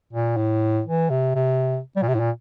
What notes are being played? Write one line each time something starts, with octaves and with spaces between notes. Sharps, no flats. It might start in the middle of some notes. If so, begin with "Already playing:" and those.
A#2
A2
E3
C3
C3
G3
A#2
C3
A2
A#2